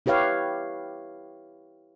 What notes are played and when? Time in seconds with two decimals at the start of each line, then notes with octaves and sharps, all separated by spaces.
0.06 E4 G4 B4 C#5 F5